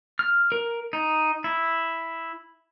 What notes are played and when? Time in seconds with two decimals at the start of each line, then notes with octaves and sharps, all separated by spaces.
0.19 F6
0.52 A#4
0.93 D#4
1.44 E4